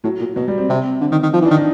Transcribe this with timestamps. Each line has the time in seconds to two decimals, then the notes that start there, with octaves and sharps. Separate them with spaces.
0.04 A2 F#3
0.20 A#2
0.36 B2 F#3
0.48 G3
0.58 C4
0.69 C3
1.01 D3
1.12 D#3
1.23 D#3
1.34 F3
1.42 E3
1.45 D4
1.51 D#3
1.56 D#4